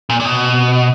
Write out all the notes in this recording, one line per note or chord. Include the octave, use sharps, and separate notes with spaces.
A#2
A#2
B2